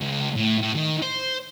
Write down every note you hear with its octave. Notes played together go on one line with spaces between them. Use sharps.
C#2
A2
A2
D#3
C5